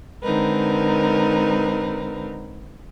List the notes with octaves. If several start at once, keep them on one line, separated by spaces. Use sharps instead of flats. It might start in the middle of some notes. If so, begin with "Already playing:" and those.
D3 G#3 C4 D#4 A#4 B4